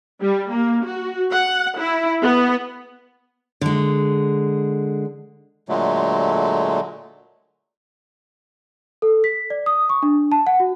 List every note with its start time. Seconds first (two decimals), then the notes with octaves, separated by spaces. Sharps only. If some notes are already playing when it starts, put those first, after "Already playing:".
0.21 G3
0.49 A#3
0.85 F#4
1.31 F#5
1.78 E4
2.22 B3
3.61 D3 G#3
5.69 A#2 D3 F#3 G#3 A3
9.02 A4
9.24 B6
9.50 D5
9.66 D#6
9.89 C#6
10.03 D4
10.32 A5
10.47 F#5
10.60 F#4